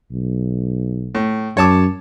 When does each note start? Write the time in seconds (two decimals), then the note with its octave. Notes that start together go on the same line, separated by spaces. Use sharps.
0.12 B1
1.15 A2
1.57 F#2 C#5 A5 D6